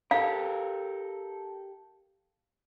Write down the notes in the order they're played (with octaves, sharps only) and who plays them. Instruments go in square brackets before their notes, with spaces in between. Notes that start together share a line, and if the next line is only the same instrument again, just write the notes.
[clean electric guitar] G4 A4 A#4 [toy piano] F5